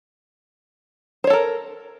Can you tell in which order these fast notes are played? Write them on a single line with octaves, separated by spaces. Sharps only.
C5 C#5 A4 A#4